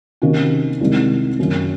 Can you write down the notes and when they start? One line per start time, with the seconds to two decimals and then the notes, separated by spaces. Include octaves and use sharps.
0.22 C3 D#3 A#3 C#4 F#4
0.81 C2 C3 D#3 G#3
1.39 F#2 D#3 A#3